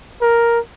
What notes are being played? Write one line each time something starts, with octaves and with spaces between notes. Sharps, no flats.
A#4